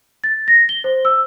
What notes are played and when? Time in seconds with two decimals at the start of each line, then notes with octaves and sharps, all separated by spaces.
0.24 A6
0.48 A#6
0.69 G7
0.84 C5
1.05 E6